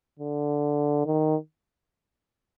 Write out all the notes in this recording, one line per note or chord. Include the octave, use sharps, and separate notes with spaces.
D3
D#3